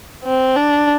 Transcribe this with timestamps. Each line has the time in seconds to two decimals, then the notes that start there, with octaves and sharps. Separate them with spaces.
0.24 C4
0.56 D4